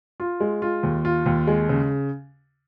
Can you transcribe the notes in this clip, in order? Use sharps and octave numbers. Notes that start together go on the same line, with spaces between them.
F4
G#3
F4
D#2
F4
D#2
G#3
C#3